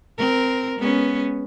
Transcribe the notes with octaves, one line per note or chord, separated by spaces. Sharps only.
C4 A#4
G#3 B3 C#4